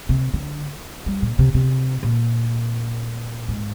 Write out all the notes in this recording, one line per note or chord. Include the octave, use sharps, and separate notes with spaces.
C3
D3
G3
A#2
C3
C3
A#2
G#2